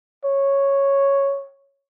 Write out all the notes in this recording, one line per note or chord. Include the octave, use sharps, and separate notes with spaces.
C#5